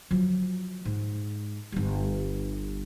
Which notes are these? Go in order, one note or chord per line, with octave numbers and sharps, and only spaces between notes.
F3 F#3
G#2
G1 G3